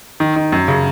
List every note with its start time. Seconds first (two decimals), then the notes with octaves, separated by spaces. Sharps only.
0.20 D#3
0.36 D#3
0.52 F#2
0.68 C#3